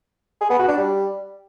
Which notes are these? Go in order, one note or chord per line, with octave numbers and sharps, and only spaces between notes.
G#4
B3
F#4
D4
G3